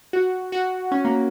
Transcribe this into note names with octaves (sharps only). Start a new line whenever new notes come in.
F#4
F#4
C#4
A#3